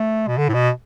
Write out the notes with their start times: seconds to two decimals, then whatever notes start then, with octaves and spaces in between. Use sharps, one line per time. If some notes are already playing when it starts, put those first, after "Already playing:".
Already playing: A3
0.28 B2
0.38 D3
0.49 A2
0.54 B2